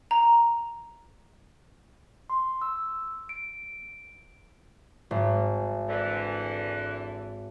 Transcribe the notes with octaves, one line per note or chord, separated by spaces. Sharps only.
A#5
C6
E6
D7
G#1
D3 E3